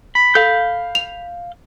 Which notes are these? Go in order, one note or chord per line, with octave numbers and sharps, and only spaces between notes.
B5
A4 F5 G6
F7